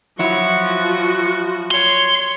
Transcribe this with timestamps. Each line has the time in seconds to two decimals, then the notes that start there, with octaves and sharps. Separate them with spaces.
0.19 F3 F#3 E4 F#4 C#6
1.71 C#5 C6